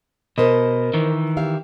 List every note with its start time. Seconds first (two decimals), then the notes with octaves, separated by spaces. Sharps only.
0.38 B2 A#4 C5 D#5
0.94 D#3 E3
1.37 G4 E5 F5